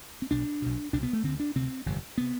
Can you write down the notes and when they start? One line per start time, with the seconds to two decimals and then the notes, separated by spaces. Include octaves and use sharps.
0.22 C4
0.31 B1 B2 D4
0.62 B1 B2
0.93 C2 B2 D4
1.03 B3
1.13 A3
1.23 D2 D3 C4
1.40 D4
1.55 D2 C3 C4
1.86 G1 F2 C3
2.18 C3 B3